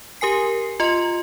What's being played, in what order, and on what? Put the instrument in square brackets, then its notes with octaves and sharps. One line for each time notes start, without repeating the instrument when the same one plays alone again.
[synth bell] G4 A#4 G#5 C7
F4 D#5 C6